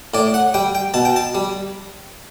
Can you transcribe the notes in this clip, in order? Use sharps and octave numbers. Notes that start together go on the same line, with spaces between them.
A2 D5
F#5
G3 G5
G5
B2 A5
G5
A5
G3